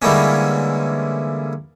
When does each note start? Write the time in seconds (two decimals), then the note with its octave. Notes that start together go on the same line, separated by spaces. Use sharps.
0.02 D3 E3 G3 G#3 A#3 C#4